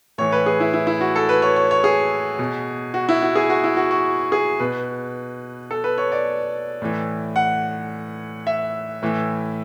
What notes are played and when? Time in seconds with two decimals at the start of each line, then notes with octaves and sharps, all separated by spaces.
0.18 A2 E3 C#5
0.32 B4
0.46 G#4
0.60 E4
0.73 E4
0.87 E4
1.01 F#4
1.16 A4
1.29 B4
1.42 C#5
1.56 C#5
1.71 C#5
1.84 G#4
2.39 B2
2.94 F#4
3.09 E4
3.22 F#4
3.35 G#4
3.50 F#4
3.64 E4
3.77 F#4
3.91 F#4
4.32 G#4
4.60 B2 B4
5.71 A4
5.84 B4
5.98 C#5
6.12 D5
6.82 A2 E3
7.36 F#5
8.47 E5
9.03 A2 E3